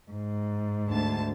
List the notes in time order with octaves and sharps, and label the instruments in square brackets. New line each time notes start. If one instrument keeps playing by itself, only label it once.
[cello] G#2
[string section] D2 A5